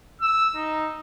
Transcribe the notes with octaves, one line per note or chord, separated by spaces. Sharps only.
E6
D#4